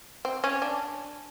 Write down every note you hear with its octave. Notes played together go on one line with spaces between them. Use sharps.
C4
C#4
D4